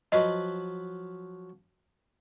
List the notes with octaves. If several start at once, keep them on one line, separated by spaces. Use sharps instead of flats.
F3 F#3 B4 D#5